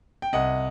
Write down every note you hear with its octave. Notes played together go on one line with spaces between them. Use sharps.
G5
C2 D#5 F#5